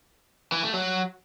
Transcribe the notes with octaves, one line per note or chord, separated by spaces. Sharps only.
E3
A3
F#3